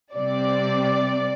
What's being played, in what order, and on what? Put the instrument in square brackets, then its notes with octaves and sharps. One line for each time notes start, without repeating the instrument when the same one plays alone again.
[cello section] C3 G3 C4 [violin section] D5